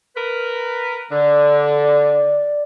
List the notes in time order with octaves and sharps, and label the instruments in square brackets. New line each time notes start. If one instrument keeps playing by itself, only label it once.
[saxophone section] A#4 B4
[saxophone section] D3 [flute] D5